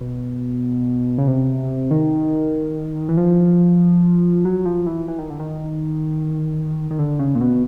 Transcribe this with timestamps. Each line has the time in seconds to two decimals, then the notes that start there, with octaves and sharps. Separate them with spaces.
0.01 B2
1.18 C#3
1.27 C3
1.91 D#3
3.09 E3
3.17 F3
4.45 F#3
4.65 F3
4.86 E3
5.08 E3
5.18 D#3
5.30 D3
5.39 D#3
6.91 D#3
6.99 D3
7.19 C#3
7.35 A#2
7.41 B2